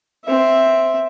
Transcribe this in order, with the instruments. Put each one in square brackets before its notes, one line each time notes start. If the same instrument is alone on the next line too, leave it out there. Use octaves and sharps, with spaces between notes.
[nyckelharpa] C4 E5